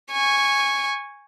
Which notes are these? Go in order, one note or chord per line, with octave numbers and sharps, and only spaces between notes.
G#5 C#6